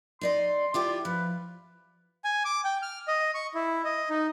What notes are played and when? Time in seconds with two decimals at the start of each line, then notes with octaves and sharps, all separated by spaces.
0.21 D#4 D5 D#5 C6
0.74 E4 F4 G4 D5
1.05 F3 B4
2.25 G#5
2.45 D6
2.64 G5
2.82 F6
3.08 D#5
3.35 C#6
3.54 E4
3.85 D#5
4.10 D#4